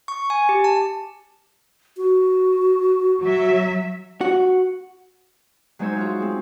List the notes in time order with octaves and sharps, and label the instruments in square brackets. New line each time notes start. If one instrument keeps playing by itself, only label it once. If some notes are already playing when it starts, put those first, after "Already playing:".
[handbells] C#6
G#5
G4
A5
[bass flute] F#4
[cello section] F#3 E5
[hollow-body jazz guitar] F#4
[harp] F#3 G#3 D#4 C5 C#5 E5
F4 F#4 F5
G#3 C4